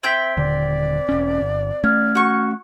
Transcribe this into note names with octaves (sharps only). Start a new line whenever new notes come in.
C4 E5 G5 G6 G#6 B6
D#1 D3 D5
E1 C#4
G1
A3 C#4 F6 G#6
F#4 C#6